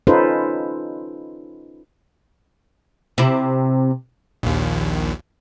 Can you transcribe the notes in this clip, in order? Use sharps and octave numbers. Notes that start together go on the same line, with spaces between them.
C#4 D#4 F4 A4 B4 C5
C3 E4
A#1 D#2